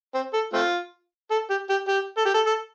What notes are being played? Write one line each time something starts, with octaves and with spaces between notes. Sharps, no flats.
C4
A4
A3 C4 F4
A4
G4
G4
G4
A4
G4
A4
A4